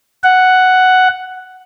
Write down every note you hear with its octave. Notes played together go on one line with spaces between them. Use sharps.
F#5